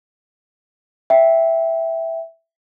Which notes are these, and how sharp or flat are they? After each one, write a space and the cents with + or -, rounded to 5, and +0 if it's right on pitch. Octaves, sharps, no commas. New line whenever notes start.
E5 +0 G5 +0